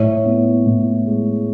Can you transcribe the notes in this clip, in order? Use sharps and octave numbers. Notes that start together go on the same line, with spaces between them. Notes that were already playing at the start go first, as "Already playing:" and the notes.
Already playing: A2 C#5
B3
A2
G#3